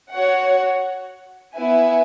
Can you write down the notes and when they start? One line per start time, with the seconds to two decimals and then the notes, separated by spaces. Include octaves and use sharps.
0.12 F#4 C#5 F#5
1.56 B3 E4 B4 E5 G#5